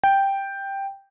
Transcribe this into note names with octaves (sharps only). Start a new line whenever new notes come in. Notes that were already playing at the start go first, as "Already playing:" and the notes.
G5